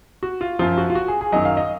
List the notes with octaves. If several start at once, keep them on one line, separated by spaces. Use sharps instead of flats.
F#4
F4
F#2 F3 F4
F#4
F4
F#4
G#4
G#4
F#2 D#3 F#3 D#5
F5
D#5